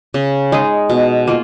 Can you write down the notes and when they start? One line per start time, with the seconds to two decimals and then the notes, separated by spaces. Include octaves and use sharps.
0.14 C#3
0.52 G#3 D#4 G#4
0.90 B2
1.27 A#3 F4